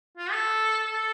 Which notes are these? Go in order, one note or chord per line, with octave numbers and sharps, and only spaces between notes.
F4
A4
A4